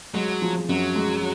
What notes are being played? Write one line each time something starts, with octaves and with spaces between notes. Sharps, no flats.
F#3 G#3
F3
F#2 F#3
G#3